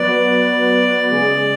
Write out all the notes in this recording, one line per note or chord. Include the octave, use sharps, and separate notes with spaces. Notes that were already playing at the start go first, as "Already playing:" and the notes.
Already playing: F#3 B3 F#4 B4 D5
C#3 G#3 C#4 G#4